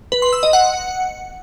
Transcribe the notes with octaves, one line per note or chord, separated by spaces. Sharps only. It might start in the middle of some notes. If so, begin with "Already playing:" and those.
B4
C6
E6
D#5
F#5